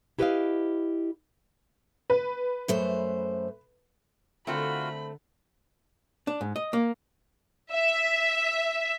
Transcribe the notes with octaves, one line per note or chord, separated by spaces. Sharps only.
E4 G4 B4 C5 D#5 F5
B4
F#2 A3 C5
D3 A3 C4 F4 F#4 A#4 F#5 B5
D4
G#2
D#5
A#3
E5